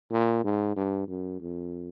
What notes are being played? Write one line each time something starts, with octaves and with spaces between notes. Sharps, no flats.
A#2
G#2
G2
F#2
F2